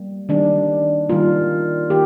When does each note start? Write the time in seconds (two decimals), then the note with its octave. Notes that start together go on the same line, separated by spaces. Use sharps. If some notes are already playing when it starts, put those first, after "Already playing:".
Already playing: G3 A#3
0.29 D#3 G3 A#3 D4
1.09 D#3 G3 A#3 F4
1.90 D#3 A#3 G4